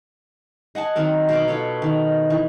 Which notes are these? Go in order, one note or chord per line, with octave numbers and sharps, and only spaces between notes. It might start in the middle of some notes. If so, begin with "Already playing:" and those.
D#5 F#5 G#5 A5
D#3 F#3 C4 A#4
B2 B3 A#4 D6
F4 A4 C#5
D#3
E3